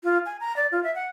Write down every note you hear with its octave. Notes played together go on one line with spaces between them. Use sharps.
F4
G#5
A#5
D5
F4
E5
F#5